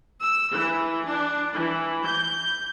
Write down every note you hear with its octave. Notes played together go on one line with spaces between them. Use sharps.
E6
E3
D4
E3
G6